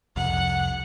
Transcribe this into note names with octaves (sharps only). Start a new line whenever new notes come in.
C2 F2 F#5